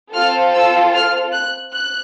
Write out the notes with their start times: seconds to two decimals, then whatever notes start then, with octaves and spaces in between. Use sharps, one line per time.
0.13 C4 F4 A4 F6
0.53 E6
0.93 F6
1.33 F#6
1.73 F#6